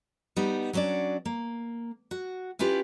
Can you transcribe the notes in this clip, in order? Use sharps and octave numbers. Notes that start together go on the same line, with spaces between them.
G3 B3 D#4
F#3 C#4 D4 F#4 D5
A#3
F#4
C#4 E4 F4 G4 B4